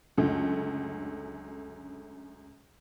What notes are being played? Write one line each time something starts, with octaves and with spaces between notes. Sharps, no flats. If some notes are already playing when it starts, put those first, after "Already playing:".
C#2 F#2 D3 A3